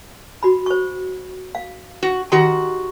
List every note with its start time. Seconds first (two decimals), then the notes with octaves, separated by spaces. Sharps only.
0.43 F#4 B5
0.66 C5 C#6
1.55 F5
2.03 F#4
2.32 D#3 F#4 G4 C6